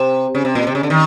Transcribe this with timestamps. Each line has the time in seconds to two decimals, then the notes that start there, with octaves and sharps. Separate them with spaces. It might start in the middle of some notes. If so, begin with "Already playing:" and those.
Already playing: C3
0.35 C#3
0.45 C3
0.55 A#2
0.67 C3
0.75 C#3
0.83 D3
0.90 D#3